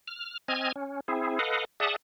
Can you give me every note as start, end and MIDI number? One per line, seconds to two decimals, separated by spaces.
0.08 0.38 89
0.48 0.72 60
0.48 0.72 75
0.48 0.72 80
0.48 0.72 89
0.48 0.72 92
0.76 1.00 61
1.08 1.39 60
1.08 1.39 64
1.08 1.39 68
1.39 1.65 69
1.39 1.65 71
1.39 1.65 75
1.39 1.65 77
1.39 1.65 78
1.80 1.96 68
1.80 1.96 74
1.80 1.96 76
1.80 1.96 78
1.80 1.96 81
1.80 1.96 87